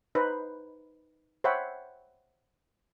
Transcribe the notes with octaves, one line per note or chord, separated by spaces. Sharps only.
D#4 B4 C5
C5 C#5 E5 F#5 G5 B5